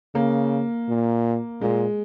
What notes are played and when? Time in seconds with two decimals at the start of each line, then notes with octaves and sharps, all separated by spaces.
0.15 C#3 A#3
0.88 A#2
1.61 A#2 G#3